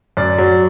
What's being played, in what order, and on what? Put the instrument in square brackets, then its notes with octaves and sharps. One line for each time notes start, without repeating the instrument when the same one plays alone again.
[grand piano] F#2 D5
F#3